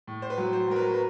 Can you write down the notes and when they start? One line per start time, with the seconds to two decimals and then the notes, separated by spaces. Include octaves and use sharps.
0.08 A2
0.22 C5
0.30 B4
0.38 F#3
0.53 C5
0.68 F#3 A#4
0.76 B4
0.94 B4